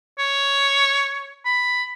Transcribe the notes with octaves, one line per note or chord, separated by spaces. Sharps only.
C#5
B5